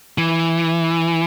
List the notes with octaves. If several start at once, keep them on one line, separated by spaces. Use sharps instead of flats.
E3